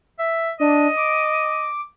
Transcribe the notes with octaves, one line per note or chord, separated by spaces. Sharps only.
E5
D4 D#5
D6